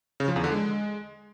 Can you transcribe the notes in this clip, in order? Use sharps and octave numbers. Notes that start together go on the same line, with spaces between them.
C#3
F3
E2
D3
G#3